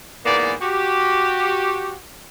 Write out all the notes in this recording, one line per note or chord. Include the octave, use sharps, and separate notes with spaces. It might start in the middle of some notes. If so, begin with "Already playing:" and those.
G#2 E3 A#3 B3 D5
F#4 G4